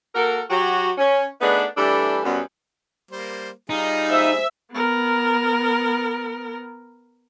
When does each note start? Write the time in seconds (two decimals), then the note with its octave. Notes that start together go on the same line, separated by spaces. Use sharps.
0.15 A#3 F#4 A4 A#4
0.50 F#3 F#4 G4
0.98 C#4
1.41 A3 B3 D4 D#4 G#4 B4
1.77 E3 G3 A3 D4 A4
2.24 F#2 G3 B3
3.11 G3 A#3 C5
3.70 G3 D#4 F4 G#4
4.10 C5 E5
4.72 B3 A#4